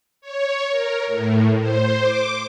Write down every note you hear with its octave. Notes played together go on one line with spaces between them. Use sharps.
C#5
A#4
A2
C5
D6